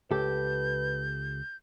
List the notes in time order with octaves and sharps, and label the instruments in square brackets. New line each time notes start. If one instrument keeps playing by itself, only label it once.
[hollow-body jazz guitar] C#2 A4 [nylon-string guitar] G4 [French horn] B4 [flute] G6